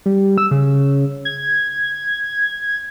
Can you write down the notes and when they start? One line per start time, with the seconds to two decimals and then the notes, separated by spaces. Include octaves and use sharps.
0.06 G3
0.38 E6
0.51 C#3
1.25 G#6